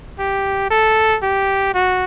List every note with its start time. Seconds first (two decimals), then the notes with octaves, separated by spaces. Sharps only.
0.19 G4
0.71 A4
1.22 G4
1.74 F#4